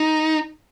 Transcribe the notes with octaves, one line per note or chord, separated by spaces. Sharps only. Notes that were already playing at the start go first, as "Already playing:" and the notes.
Already playing: D#4